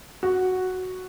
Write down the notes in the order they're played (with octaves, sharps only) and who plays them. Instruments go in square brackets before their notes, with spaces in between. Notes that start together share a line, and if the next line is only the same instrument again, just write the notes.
[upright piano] F#4